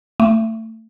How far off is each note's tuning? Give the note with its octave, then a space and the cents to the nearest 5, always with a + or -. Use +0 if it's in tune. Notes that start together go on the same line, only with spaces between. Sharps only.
A3 +25